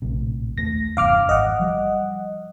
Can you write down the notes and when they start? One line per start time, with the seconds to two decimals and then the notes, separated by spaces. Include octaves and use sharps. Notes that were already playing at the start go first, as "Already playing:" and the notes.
0.02 A#1 A2 C3
0.58 D#2 A3 A#6
0.97 F1 E2 G2 F5 D6 F6
1.29 G#1 D#5 F#5
1.59 F3 G3